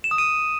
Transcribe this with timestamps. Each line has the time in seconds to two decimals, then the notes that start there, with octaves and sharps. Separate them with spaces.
0.04 E7
0.11 D#6
0.18 D#7